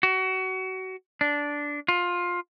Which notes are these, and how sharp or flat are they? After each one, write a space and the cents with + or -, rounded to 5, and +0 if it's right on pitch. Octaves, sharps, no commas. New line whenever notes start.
F#4 +25
D4 -10
F4 +15